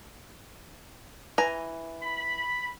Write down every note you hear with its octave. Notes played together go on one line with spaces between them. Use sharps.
E3 G#5 A#5
B5